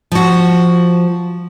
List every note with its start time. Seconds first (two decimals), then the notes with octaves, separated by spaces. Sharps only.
0.12 F3 F#4